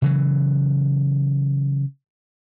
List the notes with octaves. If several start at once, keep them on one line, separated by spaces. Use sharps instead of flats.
C#3 E3 F#3